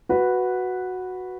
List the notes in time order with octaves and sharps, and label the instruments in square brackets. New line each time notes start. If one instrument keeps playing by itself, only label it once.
[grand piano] F#4 B4